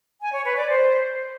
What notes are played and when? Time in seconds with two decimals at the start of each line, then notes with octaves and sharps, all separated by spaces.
0.21 G#5
0.33 C#5
0.45 B4
0.56 D5
0.68 C5